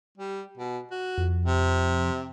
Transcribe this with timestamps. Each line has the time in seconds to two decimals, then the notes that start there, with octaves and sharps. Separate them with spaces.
0.18 G3
0.58 B2
0.91 F#4
1.18 F2
1.46 C3